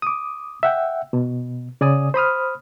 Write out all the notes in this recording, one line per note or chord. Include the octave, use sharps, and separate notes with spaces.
D6 D#6
E5 F#5 G5
B2
C#3 D5 G#5 D#6
C5 B5 D#6 F6